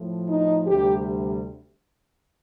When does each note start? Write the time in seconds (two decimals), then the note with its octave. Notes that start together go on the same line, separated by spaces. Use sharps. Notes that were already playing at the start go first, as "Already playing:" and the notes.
Already playing: A2 F3
0.28 D#4
0.67 D2 C3 G3 G4